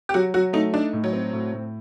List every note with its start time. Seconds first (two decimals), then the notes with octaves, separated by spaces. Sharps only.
0.09 G4
0.14 F#3 F#4
0.34 F#3 F#4
0.53 A3 D#4
0.73 D4 D#4
0.93 A2
1.04 F#3
1.13 C4
1.33 A2
1.52 A2